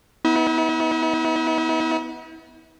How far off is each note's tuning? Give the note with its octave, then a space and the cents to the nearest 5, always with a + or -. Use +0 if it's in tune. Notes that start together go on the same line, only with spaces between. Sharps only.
B3 +0 E4 -45